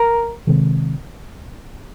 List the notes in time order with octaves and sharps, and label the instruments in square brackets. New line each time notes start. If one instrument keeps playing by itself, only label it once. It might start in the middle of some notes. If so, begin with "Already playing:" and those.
Already playing: [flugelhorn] A#4
[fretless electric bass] C3 D#3 G#3 C4